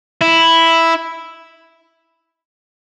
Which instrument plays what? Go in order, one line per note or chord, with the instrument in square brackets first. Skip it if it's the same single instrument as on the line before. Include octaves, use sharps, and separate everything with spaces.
[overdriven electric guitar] E4